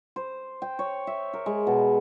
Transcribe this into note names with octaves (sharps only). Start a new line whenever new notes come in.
C5
G5
C#5
E5
A#4
G#3
B2